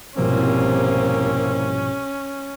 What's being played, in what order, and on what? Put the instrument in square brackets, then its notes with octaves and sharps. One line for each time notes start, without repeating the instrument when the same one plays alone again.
[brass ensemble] C2 [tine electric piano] G#2 B2 F3 [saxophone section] A#3 C4 [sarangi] C#4